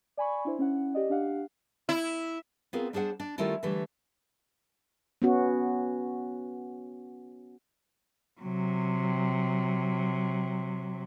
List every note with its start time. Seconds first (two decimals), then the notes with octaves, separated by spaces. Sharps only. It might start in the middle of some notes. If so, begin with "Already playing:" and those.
0.17 D5 G#5 B5 C#6
0.45 D4 E4 C5
0.59 C#4 E4 F#5
0.94 G4 D5 D#5
1.10 D4 G4 F5 F#5
1.89 E4
2.73 B3 C4 F4 G#4 A#4
2.93 G3 D4 G#4 C5 F#5
3.20 D4
3.38 D#3 G3 A3 C#4 E4 F4
3.63 D3 E3 G3 A3
5.22 B3 C#4 F#4
8.41 C3 F#3